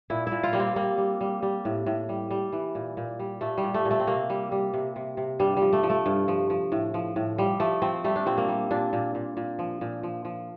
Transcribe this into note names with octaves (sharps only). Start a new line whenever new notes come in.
A#2 E4
E4
A#2
F4
G3 A#3
C4
G3 A#3
G3
G3
G3
A2
A2
G3
G3
E3
A#2
A#2
G3
A#2 A3
G3
A#2
A3
A#2
A3
C4
C3 A#3
G3
G3
C3
C3
C3
G2 G3
F3 G3
A3
F3
A3
G2
F3
F3
A2
F3
A2
F3 G3
F3 A3
F3 C4
G3 A3
D4
A#2 C4
A#3
G3
A#2 D4
A#2
A#2
A#2
F3
A#2
F3
F3